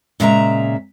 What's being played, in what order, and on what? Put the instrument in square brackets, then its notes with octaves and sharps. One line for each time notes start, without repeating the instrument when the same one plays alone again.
[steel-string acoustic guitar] A#2 C#3 G#3 E5 G#5 A#5